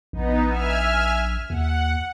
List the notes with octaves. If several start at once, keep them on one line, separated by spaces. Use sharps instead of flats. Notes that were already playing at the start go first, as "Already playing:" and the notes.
A#1 B3 D#4
E5 G#5 F6
D#2 F#5